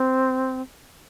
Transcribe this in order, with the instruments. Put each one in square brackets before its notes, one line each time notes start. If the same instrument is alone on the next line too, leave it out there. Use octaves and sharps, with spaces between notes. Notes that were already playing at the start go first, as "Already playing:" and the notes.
Already playing: [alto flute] C4